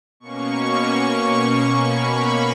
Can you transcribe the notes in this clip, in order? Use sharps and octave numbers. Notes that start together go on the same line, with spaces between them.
B2 A#3 C#4 C#6
B5